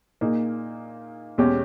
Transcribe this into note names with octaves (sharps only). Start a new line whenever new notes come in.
A#2 A#3 D#4 G#4
E2 B2 G#3 C#4 G4